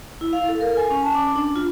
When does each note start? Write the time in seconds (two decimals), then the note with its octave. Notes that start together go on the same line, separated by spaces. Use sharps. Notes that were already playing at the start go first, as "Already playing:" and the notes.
0.21 E4
0.33 F5
0.49 A4
0.61 A#4
0.77 G#5
0.90 C#4
1.03 A5
1.15 D6
1.36 D4
1.56 F4